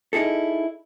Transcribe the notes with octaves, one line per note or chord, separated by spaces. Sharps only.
D#4 E4 G#4 A4